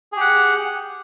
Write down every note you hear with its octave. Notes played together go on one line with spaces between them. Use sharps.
G4 G#4 F#5